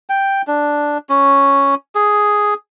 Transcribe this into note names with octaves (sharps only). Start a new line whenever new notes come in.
G5
D4
C#4
G#4